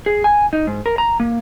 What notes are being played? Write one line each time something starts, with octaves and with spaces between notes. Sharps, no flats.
G#4
G#5
D#4
G#2
A#4
A#5
A#3